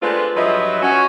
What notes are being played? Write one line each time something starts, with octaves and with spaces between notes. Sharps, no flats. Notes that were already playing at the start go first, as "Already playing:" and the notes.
G#3 A3 C4 D4 F4 B4
G2 F3 F#3 B4 D#5 E5
C#4 F#4